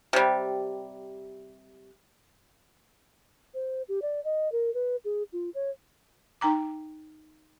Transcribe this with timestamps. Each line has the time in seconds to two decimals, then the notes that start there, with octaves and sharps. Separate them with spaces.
0.13 C3 G3
3.54 C5
3.88 G4
4.02 D5
4.24 D#5
4.52 A#4
4.74 B4
5.05 G#4
5.33 F4
5.54 C#5
6.41 D#4 G5 A#5 D6